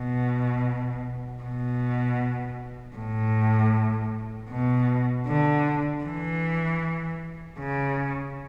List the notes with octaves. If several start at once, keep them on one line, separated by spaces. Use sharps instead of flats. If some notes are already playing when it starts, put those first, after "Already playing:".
Already playing: B2
B2
A2
B2
D3
E3
C#3